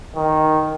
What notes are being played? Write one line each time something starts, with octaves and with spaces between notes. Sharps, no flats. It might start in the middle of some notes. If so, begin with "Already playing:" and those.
D#3